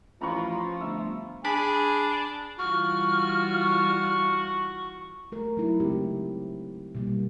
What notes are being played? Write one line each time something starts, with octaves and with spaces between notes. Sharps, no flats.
A1 F3 F4 A#5 B5 C#6
G1 A3 E5
D4 G#4 B5
E3 G3 F4 F#4 C#6 F6
A3 A#4
F#3 D#4 E4
C#3 G#3 A3 C4 G4
B2 G3 A#3